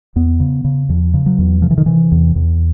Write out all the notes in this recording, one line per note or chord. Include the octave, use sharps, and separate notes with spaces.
E2 B3
C#3
C#3
E2 F3
C#3
F#3
E2
C3 F3
E3
D#3
C3 E3
E2
E2